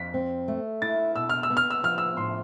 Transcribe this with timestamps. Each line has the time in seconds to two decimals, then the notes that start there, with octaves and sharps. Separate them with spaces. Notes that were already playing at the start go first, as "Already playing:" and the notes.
Already playing: F2 B6
0.14 C4
0.48 A3
0.82 E4 A6
1.16 B2 E6
1.30 F6
1.43 E6
1.50 B3
1.57 F6
1.70 E6
1.84 F3 F6
1.98 E6
2.17 A2 C6